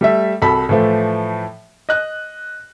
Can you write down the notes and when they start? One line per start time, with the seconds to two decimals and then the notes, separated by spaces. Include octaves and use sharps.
0.01 G3 A3 E5
0.42 C2 F#4 A4 B5 B6
0.69 A2 E3 F3 A3
1.89 D#5 F#6